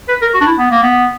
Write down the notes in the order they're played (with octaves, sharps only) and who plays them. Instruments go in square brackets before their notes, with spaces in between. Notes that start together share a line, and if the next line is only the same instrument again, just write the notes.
[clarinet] B4
A#4
F#4
D4
E4
B3
A#3
B3